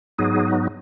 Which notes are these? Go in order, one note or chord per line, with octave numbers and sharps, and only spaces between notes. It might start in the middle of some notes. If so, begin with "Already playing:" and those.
G#2 F#3 B3 D#4 G#4